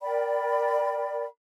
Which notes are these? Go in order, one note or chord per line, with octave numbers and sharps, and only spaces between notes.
A#4 D5 G5 B5